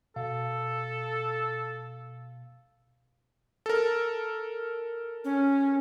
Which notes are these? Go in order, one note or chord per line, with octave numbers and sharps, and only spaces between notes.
B2 A4 F5
A4 A#4
C#4